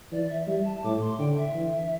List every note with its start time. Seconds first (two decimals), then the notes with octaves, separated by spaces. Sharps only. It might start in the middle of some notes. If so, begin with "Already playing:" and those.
0.12 E3 D5
0.29 E5
0.47 G3 E5
0.65 A5
0.84 A2 D6
1.01 C6
1.19 D3 G5
1.37 E5
1.55 E3